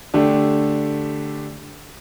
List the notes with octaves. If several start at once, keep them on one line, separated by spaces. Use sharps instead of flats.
D3 A3 D4 G4